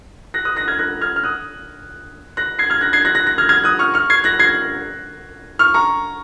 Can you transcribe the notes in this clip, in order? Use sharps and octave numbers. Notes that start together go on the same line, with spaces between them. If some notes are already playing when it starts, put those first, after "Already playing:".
F#6 A#6
D#6 F#6
F#6 A#6
F6 G#6
F#6 A#6
F6 G#6
F6
D#6 F#6
F#6 A#6
G#6 C7
F6 G#6
F#6 A#6
G#6 C7
F#6 A#6
F#6 A#6
F#6 A#6
F6 G#6
F6 G#6
D#6 F#6
C#6 F6
C#6 F6
G#6 C7
F#6 A#6
G#6 C7
C#6 F6
A#5 C#6